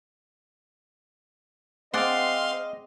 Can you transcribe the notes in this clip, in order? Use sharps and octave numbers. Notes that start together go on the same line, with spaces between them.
C4 G#4 D5 D#5 F5 F#5 C6